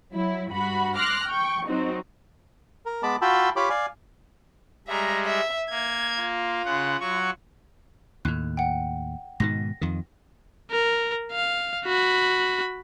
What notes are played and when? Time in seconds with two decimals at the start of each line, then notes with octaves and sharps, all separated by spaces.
0.14 F#3 E4
0.51 G2 F#4 B5
0.95 C6 D6 F6 F#6 A#6
1.27 G5 C#6
1.67 F#3 C4 D#4 F#4
2.86 A#4
3.03 G#3 B3 A5 B5 D6
3.22 F4 F#4 G5 A5 B5 E6
3.56 F4 G4 C#5 B5 D6
3.69 D5 F5 G#5
4.87 G3 G#3 E5 A#5
5.25 E5
5.70 A#3 G#6
6.21 F4
6.65 C#3 F#5
7.00 F#3 F#4 C#6
8.25 D#2 A2 F#6
8.57 F#5 G5
9.40 G#2 B2 D#3 A#6
9.81 F2 D#3
10.71 A#4
11.32 F5
11.86 F#4 B5